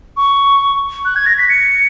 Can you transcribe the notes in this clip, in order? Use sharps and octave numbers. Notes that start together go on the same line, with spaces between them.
C#6
F#6
G#6
A#6
B6
C#7